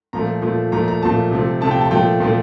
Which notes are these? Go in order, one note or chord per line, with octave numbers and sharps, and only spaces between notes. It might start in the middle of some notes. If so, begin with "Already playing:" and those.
A#2 F3 A3 A#5
A#2 F3 A3
A#2 F3 A3 A#5
A#5
A#2 F3 A3 A5
C3 F3 A3
C3 F3 A3 A5
G5
A5
A#2 F3 A3 G5
A#2 F3 A3